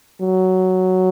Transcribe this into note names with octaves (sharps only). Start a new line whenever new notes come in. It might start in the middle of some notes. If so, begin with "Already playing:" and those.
F#3